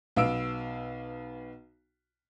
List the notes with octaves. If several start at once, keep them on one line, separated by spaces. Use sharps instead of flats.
B1 B3 F5 E6 D7